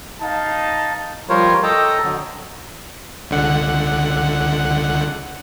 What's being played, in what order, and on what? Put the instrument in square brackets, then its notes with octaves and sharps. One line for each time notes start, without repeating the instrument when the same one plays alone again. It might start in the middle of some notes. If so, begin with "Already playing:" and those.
[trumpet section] D#4 F5 A5
[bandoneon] F3 G3 F4 A#4 C5 C#5
A4 D#5 G5 A5 A#5
D3 F#3
[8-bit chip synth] C#2 D3 F#5